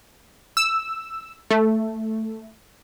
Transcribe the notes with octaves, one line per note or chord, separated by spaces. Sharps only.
E6
A3